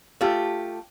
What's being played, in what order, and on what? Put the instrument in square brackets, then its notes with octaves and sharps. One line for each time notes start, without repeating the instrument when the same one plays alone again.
[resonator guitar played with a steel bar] A3 F4 G4